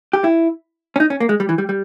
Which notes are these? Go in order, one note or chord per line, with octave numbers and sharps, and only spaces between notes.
G4
E4
C#4
D#4
C#4
A#3
G#3
G3
E3
G3
G3